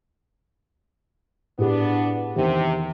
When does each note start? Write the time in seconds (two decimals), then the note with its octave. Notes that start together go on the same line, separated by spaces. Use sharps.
1.58 A2 B3 D4 G4 G#4
2.36 E2 C3 D#3 G4